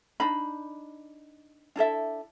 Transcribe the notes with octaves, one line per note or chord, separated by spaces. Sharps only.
D4 D#4 B5
D4 E4 A4 E5